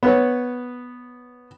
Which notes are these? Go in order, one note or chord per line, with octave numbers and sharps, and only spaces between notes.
B3 B4 C#5